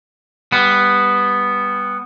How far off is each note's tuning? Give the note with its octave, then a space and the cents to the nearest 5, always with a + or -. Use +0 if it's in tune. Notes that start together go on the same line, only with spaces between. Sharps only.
G3 +25 B3 +0